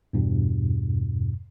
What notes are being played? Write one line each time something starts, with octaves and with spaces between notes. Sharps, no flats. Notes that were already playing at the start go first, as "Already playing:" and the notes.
E2 G2 B2